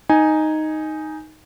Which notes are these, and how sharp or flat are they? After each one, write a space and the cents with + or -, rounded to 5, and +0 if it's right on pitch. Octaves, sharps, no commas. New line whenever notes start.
D#4 +0 G#5 +0